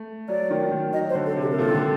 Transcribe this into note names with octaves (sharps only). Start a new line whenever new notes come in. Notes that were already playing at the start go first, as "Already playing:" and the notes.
Already playing: A3
F#3 D5
D#3
D#3
F#3 D#5
C5
D3
A4
C3
G4
A#4
A#2 A4
D#3
D3